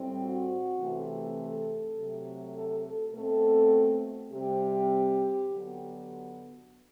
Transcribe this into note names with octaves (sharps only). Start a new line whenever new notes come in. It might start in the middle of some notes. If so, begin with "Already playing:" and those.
Already playing: A2 G3 C4
F#4
C3 E3 A3 C4
A4
C3 F#3 A3
A4
A4
B2 A3 C4 A4
C3 G3 C4 G4
D3 F#3 B3